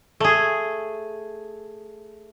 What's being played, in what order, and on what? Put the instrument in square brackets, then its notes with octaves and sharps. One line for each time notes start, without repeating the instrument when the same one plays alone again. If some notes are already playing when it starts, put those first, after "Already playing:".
[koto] A3 G#4